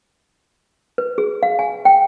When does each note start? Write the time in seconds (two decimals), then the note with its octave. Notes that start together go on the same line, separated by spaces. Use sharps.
0.98 B4
1.18 G#4
1.43 F5
1.59 G#5
1.85 G5